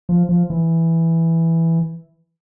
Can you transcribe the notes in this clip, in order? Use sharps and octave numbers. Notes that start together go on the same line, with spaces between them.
F3
F3
E3